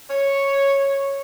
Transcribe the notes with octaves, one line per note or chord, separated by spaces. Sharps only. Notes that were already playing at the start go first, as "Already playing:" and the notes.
C#5